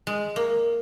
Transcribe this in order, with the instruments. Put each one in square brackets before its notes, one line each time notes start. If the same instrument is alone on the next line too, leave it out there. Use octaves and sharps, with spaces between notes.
[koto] G#3
A#3